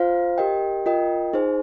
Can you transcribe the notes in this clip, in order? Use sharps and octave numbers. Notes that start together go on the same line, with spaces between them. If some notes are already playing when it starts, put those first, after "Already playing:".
Already playing: F4 C5 F5
G4 A#4 D#5 G5
F4 A#4 D#5 G5
D#4 G#4 C5